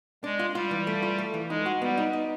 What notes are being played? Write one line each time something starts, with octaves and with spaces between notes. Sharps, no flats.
G#3 D4
F4
G3 F4
E3
A3
F4
A3
E3
G#3 D#4
F#4
G3 B3
D#4
D#4